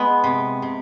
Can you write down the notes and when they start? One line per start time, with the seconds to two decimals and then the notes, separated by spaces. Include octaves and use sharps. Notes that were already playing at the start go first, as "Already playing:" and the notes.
Already playing: G#3 B3
0.24 C3
0.62 C3